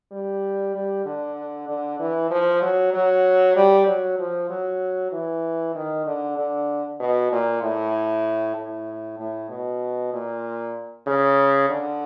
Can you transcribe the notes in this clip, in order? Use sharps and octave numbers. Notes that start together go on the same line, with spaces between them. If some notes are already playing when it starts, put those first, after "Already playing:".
G3
G3
D3
D3
E3
F3
F#3
F#3
G3
F#3
F3
F#3
E3
D#3
D3
D3
B2
A#2
A2
A2
A2
B2
A#2
C#3
D3